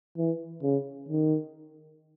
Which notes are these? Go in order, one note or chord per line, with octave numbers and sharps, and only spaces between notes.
E3
C#3
D#3